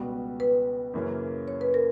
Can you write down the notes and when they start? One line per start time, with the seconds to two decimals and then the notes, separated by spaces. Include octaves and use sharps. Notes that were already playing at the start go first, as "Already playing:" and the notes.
Already playing: C#2 B2 G3 B3 F#4
0.40 B4
0.94 F#2 C#3 E3 A#3 C#4
1.48 C#5
1.61 B4
1.74 A#4